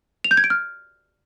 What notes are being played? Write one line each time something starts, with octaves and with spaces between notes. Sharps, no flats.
F7
G6
G#6
D7
F6